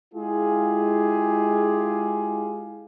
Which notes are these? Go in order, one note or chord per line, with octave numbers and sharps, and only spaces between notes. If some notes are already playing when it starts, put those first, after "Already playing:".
G#3 E4 F4 G4 G#4